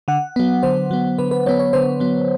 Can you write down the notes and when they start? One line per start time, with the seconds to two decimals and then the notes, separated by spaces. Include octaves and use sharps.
0.08 D3 F#5
0.36 F#3 B3
0.63 D3 C5
0.91 F#3 B3
1.19 D3 B4
1.31 B4
1.46 F#3 B3 C#5
1.59 C#5
1.73 D3 C5
2.00 F#3 B3